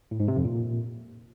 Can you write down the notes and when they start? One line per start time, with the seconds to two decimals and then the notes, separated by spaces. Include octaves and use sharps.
0.11 A2
0.20 G#2
0.28 C3
0.36 F2
0.45 A#2